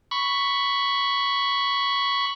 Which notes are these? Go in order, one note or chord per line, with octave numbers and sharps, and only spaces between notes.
B5 C#6